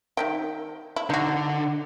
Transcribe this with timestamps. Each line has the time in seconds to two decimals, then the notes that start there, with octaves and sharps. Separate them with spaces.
0.17 D#3 E5 G5
0.96 E4
1.10 D3 D#4 F#4